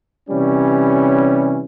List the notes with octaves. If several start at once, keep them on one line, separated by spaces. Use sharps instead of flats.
C3 E3 G3 C#4